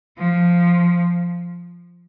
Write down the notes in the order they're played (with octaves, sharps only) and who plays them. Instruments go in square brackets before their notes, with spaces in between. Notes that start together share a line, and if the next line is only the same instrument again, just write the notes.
[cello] F3